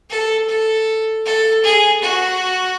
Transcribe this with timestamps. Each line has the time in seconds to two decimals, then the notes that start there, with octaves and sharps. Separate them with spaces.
0.10 A4
0.49 A4
1.26 A4
1.64 G#4
2.02 F#4